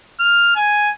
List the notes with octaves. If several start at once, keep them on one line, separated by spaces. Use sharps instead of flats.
F6
G#5